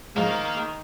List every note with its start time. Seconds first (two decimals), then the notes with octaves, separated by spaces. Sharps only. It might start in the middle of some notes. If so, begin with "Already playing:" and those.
0.17 G#2 D#3 F3 A#3 A#4